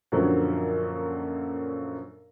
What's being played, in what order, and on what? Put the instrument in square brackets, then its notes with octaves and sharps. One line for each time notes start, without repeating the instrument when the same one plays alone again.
[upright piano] F#2 A#2 D3 F3 F#3